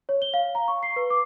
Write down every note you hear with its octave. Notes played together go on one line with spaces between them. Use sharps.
C#5
G7
F5
A#5
C#6
C7
B4
D6